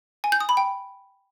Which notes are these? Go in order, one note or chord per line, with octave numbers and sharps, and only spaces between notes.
G#5
G6
D#6
B5
G5